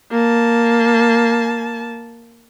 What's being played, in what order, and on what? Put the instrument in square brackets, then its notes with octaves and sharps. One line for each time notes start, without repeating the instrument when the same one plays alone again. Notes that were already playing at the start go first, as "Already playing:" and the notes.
[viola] A#3 A5